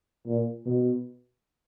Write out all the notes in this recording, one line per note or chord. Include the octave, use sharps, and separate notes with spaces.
A#2
B2